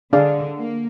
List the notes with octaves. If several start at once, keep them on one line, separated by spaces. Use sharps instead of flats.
D3 D4 G#4 D5 F5
A#3